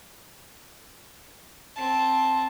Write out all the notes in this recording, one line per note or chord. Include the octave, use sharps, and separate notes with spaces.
C4 A5